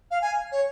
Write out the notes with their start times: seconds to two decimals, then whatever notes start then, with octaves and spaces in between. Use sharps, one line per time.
0.11 F5
0.22 G#5
0.52 C#5